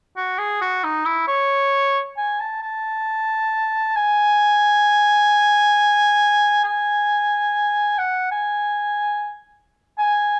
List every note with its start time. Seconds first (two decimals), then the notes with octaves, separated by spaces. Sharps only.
0.17 F#4
0.38 G#4
0.61 F#4
0.83 D#4
1.05 E4
1.28 C#5
2.17 G#5
2.40 A5
2.62 A5
3.96 G#5
6.64 G#5
7.98 F#5
8.31 G#5
9.99 G#5